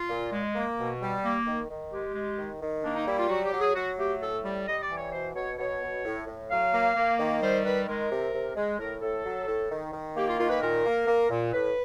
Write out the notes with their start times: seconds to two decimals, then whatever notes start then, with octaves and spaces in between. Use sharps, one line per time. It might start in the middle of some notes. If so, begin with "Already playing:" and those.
Already playing: F4
0.09 A#2
0.32 G#3
0.54 A#3
0.78 B2
1.01 G3
1.24 A#3
1.46 D#3
1.69 D#3
1.92 G#3 G4
2.14 G#3
2.38 D#3
2.61 D#3
2.83 A#3 D4
2.95 D#4
3.06 G3 E4
3.18 F4
3.29 F#3 F#4
3.45 G4
3.53 F#3
3.60 G#4
3.74 F#3 F#4
3.98 A3 G4
4.21 A2 A4
4.43 G3
4.66 G3 D#5
4.82 D5
4.89 E3
4.97 C#5
5.12 B2 C5
5.35 B2 C#5
5.57 B2 C#5
5.81 B2
6.04 A2
6.27 A2
6.50 F#3 F5
6.73 A#3
6.95 A#3
7.19 D#3
7.40 G3 C5
7.64 D#3 B4
7.87 G#3 A#4
8.10 C3
8.33 C3
8.56 G#3
8.78 A2 A#4
9.01 A2 A4
9.24 F#3
9.47 A2
9.70 D#3
9.93 D#3
10.15 A#3 G4
10.27 F4
10.39 D#3 F4
10.49 B4
10.61 A#2 A#4
10.85 A#3
11.07 A#3
11.30 A#2
11.53 A2 B4